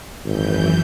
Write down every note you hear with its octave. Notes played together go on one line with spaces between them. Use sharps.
G#1 F#2 E3 G6